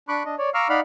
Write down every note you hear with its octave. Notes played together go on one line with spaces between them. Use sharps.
D4 B5 C#6 D6 F#6
D4 D#5
C#5 D5
F5 A#5 C#6 D6 E6 F6
D#4 D5 F5 F#5 B5 F6